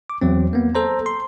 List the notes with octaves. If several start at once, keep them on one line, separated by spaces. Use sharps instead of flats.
D6
E2 F#3 C4
A#3 B3
A4 C5 A#5
C6